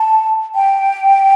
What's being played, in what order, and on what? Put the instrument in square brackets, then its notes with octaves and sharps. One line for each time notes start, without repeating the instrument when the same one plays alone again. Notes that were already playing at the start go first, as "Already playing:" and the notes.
Already playing: [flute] A5
G5